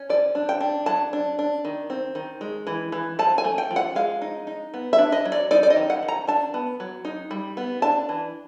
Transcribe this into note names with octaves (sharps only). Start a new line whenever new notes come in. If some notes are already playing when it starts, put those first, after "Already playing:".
Already playing: C#4
F3 D5
D4
G5
D4
F#3 A5
D4
D4
D#3
C4
D#3
G#3
E3
E3
F3 A5
G#5
A3
G5
F3
F#5
G#3 F5
D#4
D#4
B3
E5
D4
D#5
F#3
D5
D#4 D5
D5
D#5
D#3
F#5
D#3
A#5
D4 A5
B3
F#3
D#4
G3
B3
D4 A5
E3